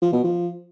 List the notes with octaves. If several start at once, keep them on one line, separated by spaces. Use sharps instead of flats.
F3
B2
F3